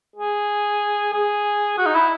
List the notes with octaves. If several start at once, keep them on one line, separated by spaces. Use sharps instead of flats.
G#4
G#4
F#4
D#4
E4